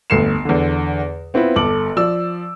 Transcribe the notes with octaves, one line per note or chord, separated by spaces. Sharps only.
G1 D2 C7 C#7 E7
E2 D3
B3 C4 E4 F4 B4
G1 A4 D6 F#7
F3 D5 E6